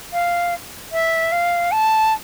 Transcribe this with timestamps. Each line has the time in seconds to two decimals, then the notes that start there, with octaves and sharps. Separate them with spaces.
0.12 F5
0.92 E5
1.32 F5
1.71 A5